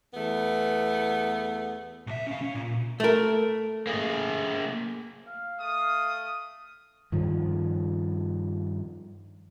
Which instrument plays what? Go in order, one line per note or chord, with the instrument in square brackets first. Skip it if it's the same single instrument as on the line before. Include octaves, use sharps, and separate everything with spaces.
[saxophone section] E2 A3 B3
[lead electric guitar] B1 E5
C#4 F5
C#4
A#2
[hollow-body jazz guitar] A3 A#4
[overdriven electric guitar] A#3 G#4
[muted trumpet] F5
[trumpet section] A3 D#6
[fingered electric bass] G2 D#3 F3